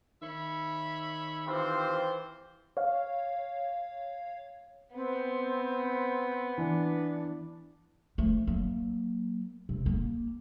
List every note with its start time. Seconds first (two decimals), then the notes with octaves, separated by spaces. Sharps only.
0.22 D#3 C#5 E5 B5
1.47 E3 C4 F4 G4 C5
2.77 C#5 F5
4.95 B3 C4
6.58 E3 D4
8.18 F3 A3
8.47 F#3 A#3
9.69 C3
9.86 A#3